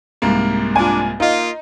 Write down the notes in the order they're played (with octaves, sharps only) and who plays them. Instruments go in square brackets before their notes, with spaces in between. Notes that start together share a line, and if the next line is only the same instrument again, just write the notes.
[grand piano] C2 G#2 A#3
[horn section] D4 [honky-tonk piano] F4 G#5
[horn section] A#3 F4 [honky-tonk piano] D#4